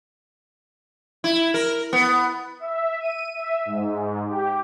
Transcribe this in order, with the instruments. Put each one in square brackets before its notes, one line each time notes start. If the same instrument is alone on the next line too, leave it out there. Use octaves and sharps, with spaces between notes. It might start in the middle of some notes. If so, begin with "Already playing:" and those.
[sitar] E4
A#4
B3
[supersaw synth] E5
D#7
E5
G#2
G4